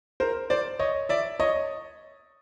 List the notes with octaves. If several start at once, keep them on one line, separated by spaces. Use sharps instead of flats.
A#4 C5
C5 D5
C#5 D#5
D5 E5
C#5 D#5